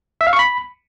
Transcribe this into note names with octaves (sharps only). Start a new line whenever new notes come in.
E5
F5
C#6
B5